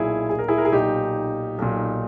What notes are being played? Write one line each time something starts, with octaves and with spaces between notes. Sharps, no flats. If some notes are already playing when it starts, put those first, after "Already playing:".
Already playing: B1 A#2 E4 G#4
G#4
A#4
E4 G#4
A#4
G#4
B1 A#2 D#4 G4
B1 A#2